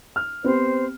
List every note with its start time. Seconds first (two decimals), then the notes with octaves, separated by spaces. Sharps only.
0.16 F6
0.44 B3 C4 G4 C5